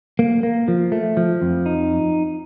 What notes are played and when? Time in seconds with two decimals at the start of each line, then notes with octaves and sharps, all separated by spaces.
0.19 A#3
0.43 A#3
0.68 F3
0.92 A3
1.17 F3
1.42 F2
1.66 D#4